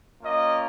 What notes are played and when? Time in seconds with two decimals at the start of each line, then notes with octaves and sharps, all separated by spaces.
0.22 A#3 C#4 F4 D#5